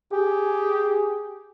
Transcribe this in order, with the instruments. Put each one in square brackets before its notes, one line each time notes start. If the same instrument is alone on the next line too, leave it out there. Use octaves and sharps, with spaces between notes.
[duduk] G4 [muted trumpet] G#4